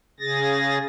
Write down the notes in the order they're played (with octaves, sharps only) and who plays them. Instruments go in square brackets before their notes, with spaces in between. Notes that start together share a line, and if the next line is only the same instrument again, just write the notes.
[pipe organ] C#3 G#4 A6 A#6